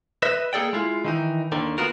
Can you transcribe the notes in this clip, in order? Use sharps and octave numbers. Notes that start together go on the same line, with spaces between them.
B4 D#5 E5
A#3 G#4 A4 D5 G5
G#3 E4 F4
D#3 E3 D#4
D#2 D3 D#3
B3 F4 F#4 A#4